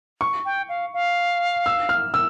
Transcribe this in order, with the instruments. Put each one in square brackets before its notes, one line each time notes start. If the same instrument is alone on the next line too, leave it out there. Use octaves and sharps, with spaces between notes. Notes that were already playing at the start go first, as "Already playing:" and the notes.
[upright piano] C#6
[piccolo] G5
F5
F5
[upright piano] E6
F6
E6